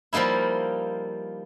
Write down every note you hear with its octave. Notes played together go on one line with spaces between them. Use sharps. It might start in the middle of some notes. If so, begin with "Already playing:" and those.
F3 G3 A#3 D#4 E4